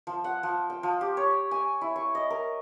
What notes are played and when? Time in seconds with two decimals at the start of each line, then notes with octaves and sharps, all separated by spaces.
0.07 F3
0.24 F#5
0.43 F3
0.70 G5
0.83 F3
1.01 G4
1.17 C#5
1.51 G#5
1.81 E4
1.96 C#6
2.15 D#5
2.30 A#4